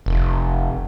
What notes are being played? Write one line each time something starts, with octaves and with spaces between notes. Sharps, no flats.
F1